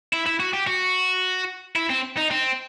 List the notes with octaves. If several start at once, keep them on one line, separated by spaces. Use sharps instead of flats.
E4
E4
F#4
G4
F#4
E4
C4
D#4
C4